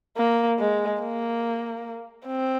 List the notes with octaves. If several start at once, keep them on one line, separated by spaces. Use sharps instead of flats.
A#3
G#3
A#3
C4